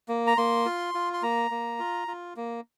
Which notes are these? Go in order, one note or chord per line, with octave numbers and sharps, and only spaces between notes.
A#3
A#5
A#3 C6
F4
F4
C6
A#3 A#5
A#3
F4
F4
A#3